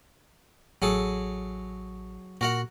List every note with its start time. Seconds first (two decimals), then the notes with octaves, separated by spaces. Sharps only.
0.82 A1 F#3 G#4 A4
2.41 A#2 F#4 A#4 F#5